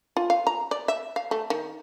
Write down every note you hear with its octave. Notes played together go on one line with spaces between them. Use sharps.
F4
F5
A#5
D5
E5
F5
A3
D#3